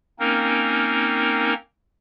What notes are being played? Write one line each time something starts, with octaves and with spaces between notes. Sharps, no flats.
A#3 C4 C#4 D#4 A#4